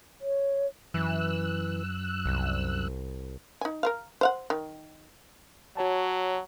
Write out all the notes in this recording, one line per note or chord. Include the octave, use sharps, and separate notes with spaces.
C#5
F#2 E3 E6 F#6
C2
D#4 G#5
A#4 C5 F5
C5 F5 F#5
D#3
F#3 F#4 C#5 A5